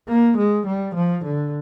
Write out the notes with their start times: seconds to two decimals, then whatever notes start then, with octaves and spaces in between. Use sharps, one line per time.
0.08 A#3
0.37 G#3
0.66 G3
0.95 F3
1.25 D3